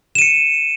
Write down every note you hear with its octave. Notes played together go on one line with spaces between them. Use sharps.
C#7 D#7 E7